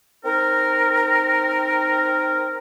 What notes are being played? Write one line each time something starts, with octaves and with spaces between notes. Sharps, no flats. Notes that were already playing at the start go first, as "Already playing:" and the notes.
C4 D#4 A#4